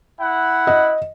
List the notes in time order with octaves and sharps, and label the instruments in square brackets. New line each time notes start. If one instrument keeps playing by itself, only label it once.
[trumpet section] E4 F#5
[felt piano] D#5